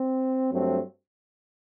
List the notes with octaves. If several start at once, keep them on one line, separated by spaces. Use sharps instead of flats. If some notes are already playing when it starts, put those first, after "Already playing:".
Already playing: C4
G2 F#3 A3 C4